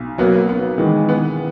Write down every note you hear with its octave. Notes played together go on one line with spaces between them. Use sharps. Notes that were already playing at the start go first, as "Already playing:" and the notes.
Already playing: B1
F#3 A#3 B3
B3
D#3 E3 G#3
B3